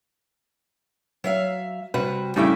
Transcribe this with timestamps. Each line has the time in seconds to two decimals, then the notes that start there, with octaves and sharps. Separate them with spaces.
1.24 F#3 E5 F5
1.94 C3 G3 F#4 B4
2.36 A2 C#3 G3 C#4 E5 G5